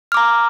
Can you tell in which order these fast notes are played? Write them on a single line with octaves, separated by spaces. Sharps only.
F6 D6 A#5